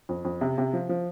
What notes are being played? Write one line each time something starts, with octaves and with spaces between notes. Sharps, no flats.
F2
F2
C3
C3
F3
F3